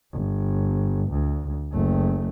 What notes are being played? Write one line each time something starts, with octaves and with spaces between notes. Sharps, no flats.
G1
D2
F#1 A3